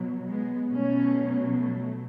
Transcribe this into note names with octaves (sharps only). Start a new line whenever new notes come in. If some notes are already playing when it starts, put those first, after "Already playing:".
Already playing: B2 F#3
G#3 B3
B2 F#3 A3 C#4
A3